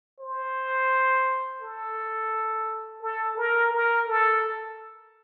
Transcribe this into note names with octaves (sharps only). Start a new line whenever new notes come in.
C5
A4
A4
A#4
A#4
A4